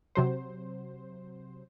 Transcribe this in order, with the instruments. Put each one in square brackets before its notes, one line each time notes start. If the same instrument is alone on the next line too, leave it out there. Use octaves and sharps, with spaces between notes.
[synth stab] C3 F#3 C5